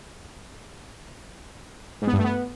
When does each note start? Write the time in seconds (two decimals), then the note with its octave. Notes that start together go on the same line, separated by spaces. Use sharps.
2.02 G#2
2.07 B3
2.13 G2
2.19 A3
2.24 B3